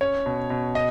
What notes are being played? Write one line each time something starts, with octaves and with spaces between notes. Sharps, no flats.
C#4 C#5
B2
B2
D#5